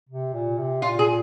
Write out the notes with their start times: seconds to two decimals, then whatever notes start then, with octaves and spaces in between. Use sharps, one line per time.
0.09 C3
0.33 A#2
0.58 C3
0.82 A#2 F4
0.99 G#4